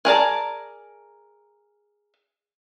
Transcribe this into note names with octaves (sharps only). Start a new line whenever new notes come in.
G#4 A#4 D5 A5